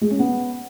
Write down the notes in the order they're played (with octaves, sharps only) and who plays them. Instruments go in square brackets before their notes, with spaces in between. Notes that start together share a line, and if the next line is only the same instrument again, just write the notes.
[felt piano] G#3
C#4
B3